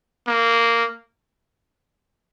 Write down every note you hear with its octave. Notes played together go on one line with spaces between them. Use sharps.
A#3